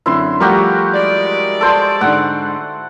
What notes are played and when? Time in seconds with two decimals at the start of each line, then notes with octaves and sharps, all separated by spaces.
0.06 F#2 D3 C4 E4 C6
0.40 F3 G3 A3 F#4 G4 A#4
0.94 G#3 D5
1.61 A4 C5 C6
2.01 G#2 D3 F#5